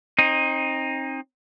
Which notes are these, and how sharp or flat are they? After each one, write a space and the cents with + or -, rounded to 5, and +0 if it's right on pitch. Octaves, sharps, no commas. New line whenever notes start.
C4 +30 D#4 +0